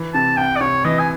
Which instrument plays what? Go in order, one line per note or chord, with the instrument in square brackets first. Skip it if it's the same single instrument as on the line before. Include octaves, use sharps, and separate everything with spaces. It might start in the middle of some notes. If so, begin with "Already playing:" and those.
Already playing: [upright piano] E3
[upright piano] C3 [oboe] A5
[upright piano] C2 [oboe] G5
[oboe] D5
[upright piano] C3 [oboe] C#5
[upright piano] E3 [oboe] D#5
[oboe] G#5